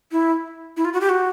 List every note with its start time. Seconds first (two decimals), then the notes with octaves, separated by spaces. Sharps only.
0.12 E4
0.77 E4
0.85 F4
0.93 F#4
1.01 G4
1.09 F#4